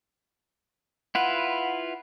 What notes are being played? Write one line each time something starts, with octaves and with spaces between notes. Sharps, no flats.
E4 F4 B4 F#5